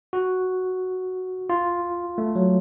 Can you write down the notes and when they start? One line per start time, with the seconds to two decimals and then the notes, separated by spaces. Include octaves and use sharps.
0.13 F#4
1.50 F4
2.18 A3
2.35 F#3